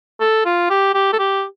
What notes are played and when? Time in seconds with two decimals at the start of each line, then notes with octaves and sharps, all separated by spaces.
0.21 A4
0.46 F4
0.70 G4
0.94 G4
1.13 A4
1.19 G4